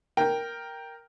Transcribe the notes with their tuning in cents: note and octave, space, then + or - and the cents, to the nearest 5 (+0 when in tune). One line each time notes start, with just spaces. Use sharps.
A#4 +0 G5 +0